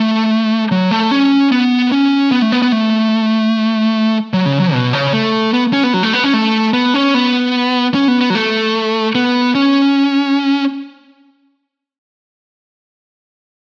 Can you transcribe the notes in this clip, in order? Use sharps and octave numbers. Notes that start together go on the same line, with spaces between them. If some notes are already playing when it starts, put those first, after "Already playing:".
Already playing: A3
F#3
A3
C#4
B3
C#4
B3
A3
B3
B3
A3
F#3
C#3
F#3
B2
C#3
A3
B3
C#4
B3
F#3
A3
B3
C#4
A3
B3
C#4
B3
C#4
B3
B3
F#3
A3
B3
C#4